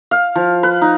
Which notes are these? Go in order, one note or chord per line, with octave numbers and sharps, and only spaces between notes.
F5
F3
B4
D#4